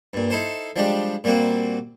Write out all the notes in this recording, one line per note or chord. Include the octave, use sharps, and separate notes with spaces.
G2 A#2
D#4 E4 A4 C5
F3 G3 G#3 D4 G4
A#2 G3 A#3 C4 F#4